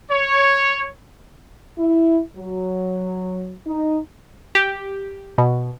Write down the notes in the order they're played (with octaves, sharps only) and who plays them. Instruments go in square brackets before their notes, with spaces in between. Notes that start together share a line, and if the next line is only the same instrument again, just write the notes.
[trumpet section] C#5
[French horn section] E4
F#3
D#4
[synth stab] G4
B2